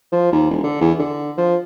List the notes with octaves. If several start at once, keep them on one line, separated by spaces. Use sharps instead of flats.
F3
D#2
E1
D3
E2
D3
F3